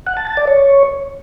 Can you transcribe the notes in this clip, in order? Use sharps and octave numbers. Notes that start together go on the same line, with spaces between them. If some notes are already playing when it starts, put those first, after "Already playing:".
F#5
A5
A5
D5
C#5